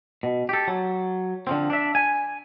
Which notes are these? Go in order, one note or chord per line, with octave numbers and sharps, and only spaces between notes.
B2
G4 A4
F#3
D3 F3 C4
D4 E5
G#5